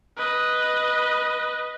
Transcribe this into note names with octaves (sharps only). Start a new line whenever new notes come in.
B4 D#5